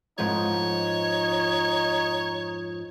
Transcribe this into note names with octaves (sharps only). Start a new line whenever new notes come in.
F2 G#2 F3 D#4 C#5